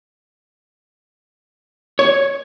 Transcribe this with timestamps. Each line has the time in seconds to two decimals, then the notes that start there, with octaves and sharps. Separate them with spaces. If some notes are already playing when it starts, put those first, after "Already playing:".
1.99 C#5